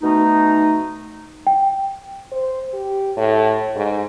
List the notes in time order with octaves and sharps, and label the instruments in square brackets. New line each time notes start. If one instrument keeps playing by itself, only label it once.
[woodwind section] B2 A3 D#4
[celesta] G5
[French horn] C5
G4
A2
G#2